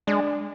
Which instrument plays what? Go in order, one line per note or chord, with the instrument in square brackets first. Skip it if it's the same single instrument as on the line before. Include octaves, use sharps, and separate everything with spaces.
[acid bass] G#3 [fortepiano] D4